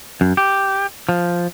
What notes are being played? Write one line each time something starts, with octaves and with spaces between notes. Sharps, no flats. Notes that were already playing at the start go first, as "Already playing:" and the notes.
F#2
G4
F3